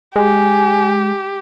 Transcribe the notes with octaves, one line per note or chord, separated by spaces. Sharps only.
G#3 G4 G#5